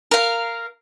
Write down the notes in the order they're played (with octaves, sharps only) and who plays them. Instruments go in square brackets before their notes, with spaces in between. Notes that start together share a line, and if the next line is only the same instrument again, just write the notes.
[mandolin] A#4 F5